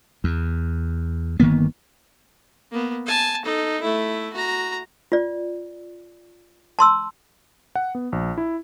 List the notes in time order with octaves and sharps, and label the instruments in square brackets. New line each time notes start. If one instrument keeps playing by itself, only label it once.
[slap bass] E2
G1 D#3 A#3 B3
[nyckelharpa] A#3 B3
G#5 A5
D#4 A4
A3 E4
F#4 A#5
[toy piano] F4 D5
A5 C6 E6
[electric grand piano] F#5
B3
A#1
E4